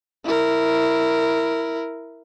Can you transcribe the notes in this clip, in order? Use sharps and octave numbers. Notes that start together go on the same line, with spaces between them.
E4 A#4